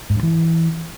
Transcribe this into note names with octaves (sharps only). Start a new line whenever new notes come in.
G#2
G2
E3